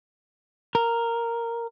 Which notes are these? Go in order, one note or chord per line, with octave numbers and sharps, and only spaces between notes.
A#4